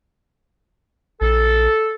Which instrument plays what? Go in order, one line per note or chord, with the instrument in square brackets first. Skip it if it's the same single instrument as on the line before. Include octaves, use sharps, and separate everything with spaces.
[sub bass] A#1 [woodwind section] A4